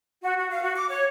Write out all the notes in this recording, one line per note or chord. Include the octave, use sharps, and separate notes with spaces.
F#4
F#4
F5
F#4
D6
C#5